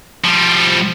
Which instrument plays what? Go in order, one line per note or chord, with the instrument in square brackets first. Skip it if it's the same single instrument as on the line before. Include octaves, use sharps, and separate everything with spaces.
[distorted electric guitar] F3 G3